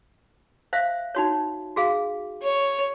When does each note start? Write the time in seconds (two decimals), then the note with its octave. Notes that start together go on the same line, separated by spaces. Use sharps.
0.73 C5 E5 F5
1.15 D#4 F#4 C#5
1.76 F#4 G#4 F5
2.42 C#5